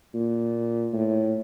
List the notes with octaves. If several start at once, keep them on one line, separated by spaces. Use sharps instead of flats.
A#2
A2